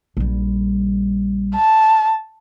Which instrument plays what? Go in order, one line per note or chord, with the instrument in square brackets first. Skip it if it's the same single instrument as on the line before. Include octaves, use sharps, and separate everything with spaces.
[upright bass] A#1 G3
[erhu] A5